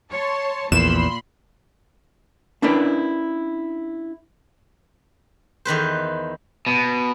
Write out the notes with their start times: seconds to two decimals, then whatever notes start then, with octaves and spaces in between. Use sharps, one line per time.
0.10 C#5 A5 C6
0.72 A#1 E2 A#2 B5 C6 E7
2.62 C#4 D4 E4 A#4 B4 D5
5.65 E2 D#3 B4 C5
6.67 B2